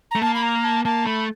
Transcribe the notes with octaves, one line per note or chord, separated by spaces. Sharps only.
A3 A#5
A#3 A5
B5
A#5
A5
A#3 A5
A3 B5